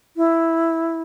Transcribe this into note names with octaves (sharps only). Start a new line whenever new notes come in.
E4